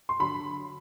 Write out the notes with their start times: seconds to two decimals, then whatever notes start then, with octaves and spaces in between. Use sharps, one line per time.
0.09 C6
0.20 D3 F#3 B5